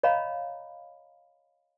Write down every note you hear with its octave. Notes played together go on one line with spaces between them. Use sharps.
C#5 D#5 F5 A#5 B5